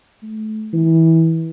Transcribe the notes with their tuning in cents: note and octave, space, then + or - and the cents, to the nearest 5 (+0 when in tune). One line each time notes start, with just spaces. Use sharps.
A3 -25
E3 -20